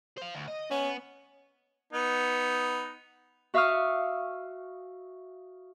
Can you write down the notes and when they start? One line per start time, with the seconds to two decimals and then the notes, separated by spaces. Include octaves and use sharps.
0.18 C5 F5
0.34 D2
0.48 D#5
0.71 B3 C#4
1.93 B3 D#4
3.54 F#4 E5 F5 C#6 D#6 F6